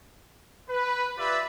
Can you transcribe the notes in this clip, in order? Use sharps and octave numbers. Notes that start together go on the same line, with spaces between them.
B4
F4 G4 B4 D5 E5 B5